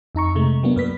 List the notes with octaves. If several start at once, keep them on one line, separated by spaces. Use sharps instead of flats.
F2 D#4 A#5 C#6
C3 G#3 A3
F#3 A#3 B3 D4
F#2 B4 B6